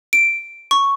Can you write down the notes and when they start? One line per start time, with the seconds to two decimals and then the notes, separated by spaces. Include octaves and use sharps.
0.13 D7
0.71 C#6